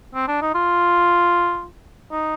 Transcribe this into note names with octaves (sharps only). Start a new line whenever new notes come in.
C4
D4
D#4
F4
D#4